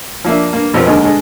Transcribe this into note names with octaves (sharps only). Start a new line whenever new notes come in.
F3 A#3 D4 E5
G2 A#3
F2 F3 G3 B3 C4 A#4
D#2 D3 G#3 A4 A#4 C6
G2 G#3 A4